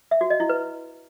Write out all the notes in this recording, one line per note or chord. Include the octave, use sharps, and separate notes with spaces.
E5
F#4
D#5
E4
B4